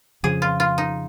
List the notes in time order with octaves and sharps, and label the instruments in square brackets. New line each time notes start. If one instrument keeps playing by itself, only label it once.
[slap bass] F2 C#3 F3 [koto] G#4
[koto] F4
F4
D#4